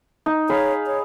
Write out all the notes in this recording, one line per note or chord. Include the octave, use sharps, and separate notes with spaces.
D#4
G#4 C#5 F5 B5
C#5